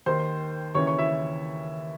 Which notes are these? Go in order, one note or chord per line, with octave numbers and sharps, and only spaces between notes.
D#2 D#3 C5 C6
D#2 C#3 E3 C#5 C#6
C#5 C#6
E4 E5